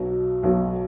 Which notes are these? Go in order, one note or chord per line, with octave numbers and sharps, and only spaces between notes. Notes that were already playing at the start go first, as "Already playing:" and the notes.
Already playing: B1 B2 F#3
B1 B2 F#3